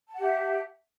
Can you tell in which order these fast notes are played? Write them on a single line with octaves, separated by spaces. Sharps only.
A5 F#5 G4 E5